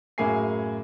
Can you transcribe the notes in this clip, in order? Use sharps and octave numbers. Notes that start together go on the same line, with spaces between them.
F#2 A2 A#3 G#4 G#5 C7